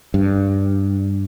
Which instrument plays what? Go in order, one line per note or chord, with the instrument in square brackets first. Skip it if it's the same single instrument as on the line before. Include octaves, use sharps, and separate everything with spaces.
[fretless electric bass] G2